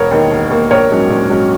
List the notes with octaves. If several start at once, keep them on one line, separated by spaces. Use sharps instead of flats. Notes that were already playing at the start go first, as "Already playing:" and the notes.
Already playing: E1 A#4 C#5
D#2 D#3 A#3
E1
D#2 D#3 A#3
A#1 A#4 C#5
G#2 F#3 C#4
A#1
G#2 F#3 C#4